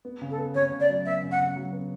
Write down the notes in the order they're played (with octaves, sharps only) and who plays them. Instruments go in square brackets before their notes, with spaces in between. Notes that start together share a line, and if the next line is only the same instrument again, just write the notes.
[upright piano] B3
C#3
[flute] A4
[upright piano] B3
[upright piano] C#3 [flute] C#5
[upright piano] C#3
[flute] D5
[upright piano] F#3
[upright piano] B3 [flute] E5
[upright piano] C#3
[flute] F#5
[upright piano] C#3
F#3
B3